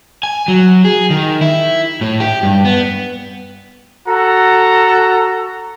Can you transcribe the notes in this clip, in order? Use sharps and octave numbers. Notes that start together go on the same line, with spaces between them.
G#5
F#3
G#4
D#3
E4
A2
G4
G2
B3
F#4 A4 A#5